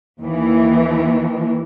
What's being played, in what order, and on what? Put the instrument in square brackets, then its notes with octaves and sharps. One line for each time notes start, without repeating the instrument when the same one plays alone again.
[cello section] D#2 E3